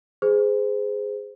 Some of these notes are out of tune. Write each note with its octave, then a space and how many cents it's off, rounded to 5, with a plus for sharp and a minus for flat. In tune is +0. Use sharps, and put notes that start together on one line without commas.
G#4 +0 C5 -30